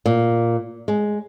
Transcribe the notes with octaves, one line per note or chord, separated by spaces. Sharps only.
A#2
G#3